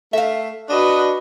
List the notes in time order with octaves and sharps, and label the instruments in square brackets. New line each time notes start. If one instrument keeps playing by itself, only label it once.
[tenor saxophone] A3 [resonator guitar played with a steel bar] E5 F5
[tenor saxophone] D4 [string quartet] F#4 B4 D#5